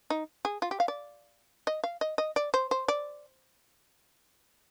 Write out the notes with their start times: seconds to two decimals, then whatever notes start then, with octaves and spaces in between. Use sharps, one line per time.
0.10 D#4
0.45 G#4
0.62 F4
0.71 G4
0.80 F5
0.88 D5
1.67 D#5
1.84 F5
2.01 D#5
2.18 D#5
2.36 D5
2.54 C5
2.71 C5
2.88 D5